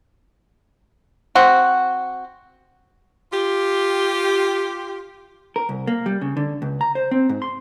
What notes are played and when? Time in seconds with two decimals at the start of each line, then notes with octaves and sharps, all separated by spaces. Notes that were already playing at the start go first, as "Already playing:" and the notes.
1.35 C4 F#4
3.32 F4 G4
5.56 A#4
5.69 C2
5.87 A#3
6.06 G3
6.21 C#3
6.37 D3
6.62 C#2
6.81 A#5
6.95 C5
7.11 C4
7.29 G#2
7.42 C6